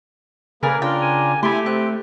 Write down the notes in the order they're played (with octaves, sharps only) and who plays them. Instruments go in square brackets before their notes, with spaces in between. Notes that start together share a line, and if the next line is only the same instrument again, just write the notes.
[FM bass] C#3 [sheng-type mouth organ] A#3 G#4 B4 [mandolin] A#4 D5 G#5
[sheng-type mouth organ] D4 F4 A#4 [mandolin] G5
[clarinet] G#5
[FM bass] A3 [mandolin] B3 C6 [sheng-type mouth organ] E4 G#5 [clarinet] G4
[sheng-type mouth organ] C4 [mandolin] F#6